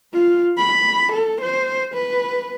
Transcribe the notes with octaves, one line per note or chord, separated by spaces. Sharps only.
F4
B5
A4
C5
B4